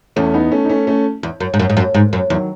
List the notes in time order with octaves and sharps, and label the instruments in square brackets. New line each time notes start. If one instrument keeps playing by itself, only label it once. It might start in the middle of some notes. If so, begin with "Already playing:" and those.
[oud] E2 [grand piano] A3 C#4
[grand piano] B3 D#4
A3 C#4
D#4
A3 C#4
A3 C#4
[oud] E2
F#2
G#2
F#2
G#2
F#2
G#2
F#2
[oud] E2 [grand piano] D#3 F#3